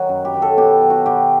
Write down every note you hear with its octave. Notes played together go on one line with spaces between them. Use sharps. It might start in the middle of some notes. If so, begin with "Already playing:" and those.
Already playing: D#3 F#3
F#2
G4
D#3 F#3
A4
B2 G4
F#3
F#4
B2 G4